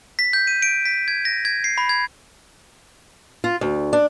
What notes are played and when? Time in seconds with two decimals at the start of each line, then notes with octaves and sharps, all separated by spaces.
0.19 B6
0.33 G6
0.47 D#7
0.62 D7
0.85 B6
1.08 G#6
1.25 A#6
1.45 G#6
1.64 C7
1.78 B5
1.89 G#6
3.44 F4
3.61 D2
3.93 D4